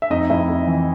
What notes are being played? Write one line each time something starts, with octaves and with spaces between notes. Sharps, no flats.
E5
F2 D#4 D#5
F2 E4 E5
F2
E3